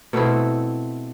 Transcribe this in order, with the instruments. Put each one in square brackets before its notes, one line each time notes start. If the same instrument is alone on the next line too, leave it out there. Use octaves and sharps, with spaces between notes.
[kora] B2 A3 C4 E4